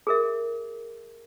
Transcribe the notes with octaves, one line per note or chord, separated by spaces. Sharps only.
G#4 A#4 E5